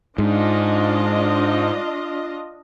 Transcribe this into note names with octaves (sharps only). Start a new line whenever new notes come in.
G#2 D4 F4 D#5